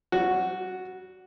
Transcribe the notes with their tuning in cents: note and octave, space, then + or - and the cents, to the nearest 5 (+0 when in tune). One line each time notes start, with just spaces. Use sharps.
G3 -35 F#4 +0